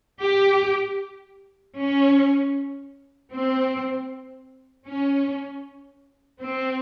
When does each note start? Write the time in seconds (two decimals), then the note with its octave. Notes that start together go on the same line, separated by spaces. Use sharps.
0.22 G4
1.77 C#4
3.32 C4
4.86 C#4
6.40 C4